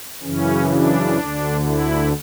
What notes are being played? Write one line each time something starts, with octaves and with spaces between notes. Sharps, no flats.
F#2 C#3 E3 C#4
D4
D2 D3
E4